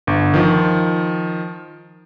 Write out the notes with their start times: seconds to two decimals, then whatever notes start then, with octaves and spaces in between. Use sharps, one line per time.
0.07 G1
0.34 D#3 F3